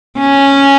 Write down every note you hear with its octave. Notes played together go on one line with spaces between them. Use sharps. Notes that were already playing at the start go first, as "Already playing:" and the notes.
C#4